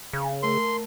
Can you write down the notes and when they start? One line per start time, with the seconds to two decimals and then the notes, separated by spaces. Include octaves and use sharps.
0.13 C#3
0.43 A3 A#4 C6